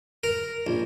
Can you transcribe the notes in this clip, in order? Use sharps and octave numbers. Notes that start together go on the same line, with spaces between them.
A#4
A#1